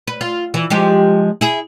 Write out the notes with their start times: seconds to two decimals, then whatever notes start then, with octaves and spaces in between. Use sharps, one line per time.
0.08 B4
0.21 F4
0.54 E3
0.70 F3 G#3 G4
1.41 E4 G#4